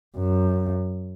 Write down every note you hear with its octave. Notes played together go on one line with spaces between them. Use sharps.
F#2